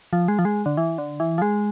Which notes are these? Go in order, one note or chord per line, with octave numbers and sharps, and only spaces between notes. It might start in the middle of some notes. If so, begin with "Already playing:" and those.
F3
G#3
F3
G#3
D3
E3
D3
E3
F3
G#3